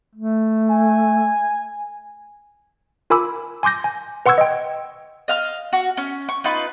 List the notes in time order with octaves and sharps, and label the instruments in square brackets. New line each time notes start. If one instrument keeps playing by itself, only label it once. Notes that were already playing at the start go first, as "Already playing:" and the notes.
[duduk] A3
[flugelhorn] G#5
[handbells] F4 A#4 G#5 B5 D6 E6
G#5 C6 D6 G6 A#6
G#5
B4 F#5 C6 C#6 E6 G#6
D#5 G5
[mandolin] D#5 F5 F6
F#4
C#4
C#6
D#4 F4 B4